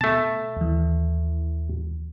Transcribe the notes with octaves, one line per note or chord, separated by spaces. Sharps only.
B2 A3 A5
D#2 E3